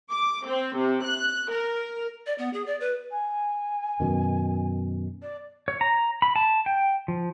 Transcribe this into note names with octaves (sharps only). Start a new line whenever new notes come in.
D6
C4
C3
F#6
A#4
D5
B3
G#4
D5
B4
G#5
F#2 B2 D#3
D5
C#5
A#5
B5
A5
G5
F3